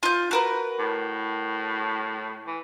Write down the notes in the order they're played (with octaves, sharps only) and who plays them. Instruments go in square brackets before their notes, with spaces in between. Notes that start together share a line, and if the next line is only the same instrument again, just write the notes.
[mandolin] F4 G6
F#4 A#4 B4
[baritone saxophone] A2
E3